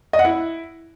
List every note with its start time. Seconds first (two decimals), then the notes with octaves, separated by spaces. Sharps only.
0.13 D#5
0.19 F#5
0.25 E4